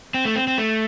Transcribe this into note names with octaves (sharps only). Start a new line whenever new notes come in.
C4
A3
C4
C4
A3